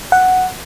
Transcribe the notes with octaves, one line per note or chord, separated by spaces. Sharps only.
F#5